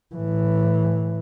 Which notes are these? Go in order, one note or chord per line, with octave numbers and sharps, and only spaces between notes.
A2 E3